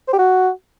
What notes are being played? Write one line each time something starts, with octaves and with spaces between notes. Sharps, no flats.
C5
G4
F#4